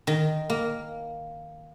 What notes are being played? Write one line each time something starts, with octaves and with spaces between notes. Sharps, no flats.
D#3
A#3